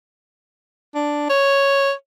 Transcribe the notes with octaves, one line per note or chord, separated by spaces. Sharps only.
D4
C#5